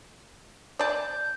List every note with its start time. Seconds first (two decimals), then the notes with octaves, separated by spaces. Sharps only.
0.79 D5 A5 G6